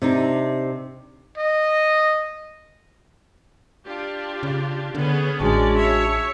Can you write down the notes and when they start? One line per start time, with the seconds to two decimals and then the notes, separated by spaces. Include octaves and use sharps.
0.02 C3 D4 D#4
1.38 D#5
3.84 D4 F4 G4
4.43 C#3
4.95 D3 B3 C#4 G#4
5.40 A1 G#3 C#4 D4 F#4 D5
5.77 C#5 E5